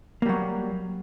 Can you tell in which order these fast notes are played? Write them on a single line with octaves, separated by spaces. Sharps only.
A#3 G3 F#3